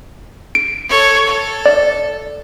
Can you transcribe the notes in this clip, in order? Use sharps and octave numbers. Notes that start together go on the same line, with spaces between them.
D7
A4 C#5
A4
D5